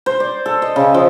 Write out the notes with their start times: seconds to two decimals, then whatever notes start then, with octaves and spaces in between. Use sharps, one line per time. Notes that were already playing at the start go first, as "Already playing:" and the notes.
0.06 C5
0.20 D5
0.46 A4
0.62 D#5
0.76 C#3
0.94 F3